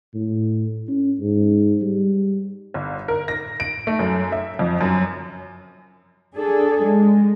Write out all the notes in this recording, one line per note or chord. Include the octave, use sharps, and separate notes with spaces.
A2
C#4
G#2
G3
G1
A#4
A#6
D7
A3
F#2
E5
F2
F#2
D4 G#4 A4
G#3